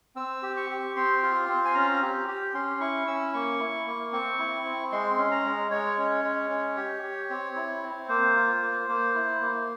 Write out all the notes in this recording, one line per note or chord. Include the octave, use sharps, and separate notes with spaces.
C4 E6
G4
C#6
G4
C4 C6
F4
C4
G#5
C#4 A#5
G4
G4
C#4 C6
E4 C#6
C#4 E6
A#3 C#6
E4
A#3
C4 C#6
E4
C4
G#3 C6
C#4
A#5
G#3
G#3 C#5
C#4
G#3
C#4
G4
G4
C4
E4
C4
A#3 C5
F4
A#3
A#3
E4
A#3